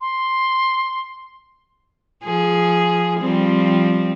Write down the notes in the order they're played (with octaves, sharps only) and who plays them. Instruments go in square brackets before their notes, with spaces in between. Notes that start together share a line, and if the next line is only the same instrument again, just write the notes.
[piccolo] C6
[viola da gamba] F3 G#4
F3 G3 C4